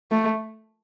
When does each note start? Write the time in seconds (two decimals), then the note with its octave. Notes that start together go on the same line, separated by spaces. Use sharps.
0.11 A3